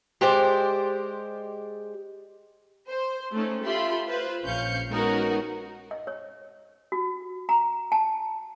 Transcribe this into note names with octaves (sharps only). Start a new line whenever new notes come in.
G#3 G4 C5 D5
C5
A3 C4 C#4 D#4 A4
F4 G4 A4 E5 B5 C6
F4 B4 C5
A#1 C#4 F5 G6 C#7
G#3 B3 C#4 D#4 F#4 A#4
D#5
C#5
F#4
A#5
A5